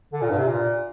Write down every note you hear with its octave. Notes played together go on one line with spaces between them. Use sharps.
D3
A#2
G2
C3
A#2